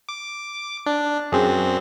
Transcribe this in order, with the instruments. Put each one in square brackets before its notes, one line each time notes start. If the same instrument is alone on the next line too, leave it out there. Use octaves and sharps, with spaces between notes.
[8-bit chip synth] D6
D4
[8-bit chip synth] F#2 C4 [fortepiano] G#4